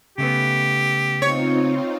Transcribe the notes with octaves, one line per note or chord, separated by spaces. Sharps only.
C#3 A3 B3 G4
C4 D#4 F4 C#5